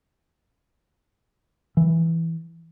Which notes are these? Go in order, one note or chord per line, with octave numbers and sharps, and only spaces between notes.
E3